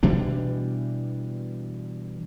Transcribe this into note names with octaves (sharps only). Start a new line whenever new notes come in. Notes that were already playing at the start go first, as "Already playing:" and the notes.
B2 E3 G3 D4